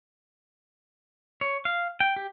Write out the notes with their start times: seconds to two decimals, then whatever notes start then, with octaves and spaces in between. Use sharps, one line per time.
1.41 C#5
1.65 F5
2.00 G5
2.16 G4